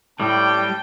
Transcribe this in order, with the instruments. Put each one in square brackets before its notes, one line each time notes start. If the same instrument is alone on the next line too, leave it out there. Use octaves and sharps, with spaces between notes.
[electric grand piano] A2 [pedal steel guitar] G3 [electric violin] G5 [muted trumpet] A5